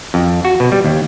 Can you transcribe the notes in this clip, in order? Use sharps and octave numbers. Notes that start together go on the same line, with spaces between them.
F2
F#4
B2
G3
D#2